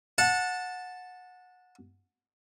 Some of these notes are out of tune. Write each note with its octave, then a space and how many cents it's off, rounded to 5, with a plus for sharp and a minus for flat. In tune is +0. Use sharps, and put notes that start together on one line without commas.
F#5 -20 A5 +0